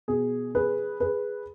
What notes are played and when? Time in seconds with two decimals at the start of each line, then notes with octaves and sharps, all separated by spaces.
0.08 B2 G#4
0.55 G#4 B4
1.00 G#4 B4